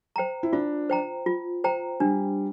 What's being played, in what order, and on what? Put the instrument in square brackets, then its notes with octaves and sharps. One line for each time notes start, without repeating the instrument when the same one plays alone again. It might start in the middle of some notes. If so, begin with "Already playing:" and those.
[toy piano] C5 G5 A#5
[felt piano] E4
[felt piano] D4 [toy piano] F4
[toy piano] C5 G5 A#5
F4
C5 G5 A#5
[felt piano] G3 [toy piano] D4